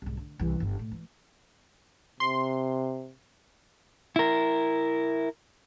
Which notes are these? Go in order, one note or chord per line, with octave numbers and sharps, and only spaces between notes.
C2 G#2
D3
C2 E3
G1
A2
E3
C3 C6
E4 A#4